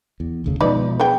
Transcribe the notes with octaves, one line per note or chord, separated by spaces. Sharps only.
E2
F1 D2 C#3
B2 F3 G#3 D#4 B4 D5
B3 G#4 G5